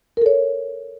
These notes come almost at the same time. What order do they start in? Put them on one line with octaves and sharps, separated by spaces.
A#4 A4 C#5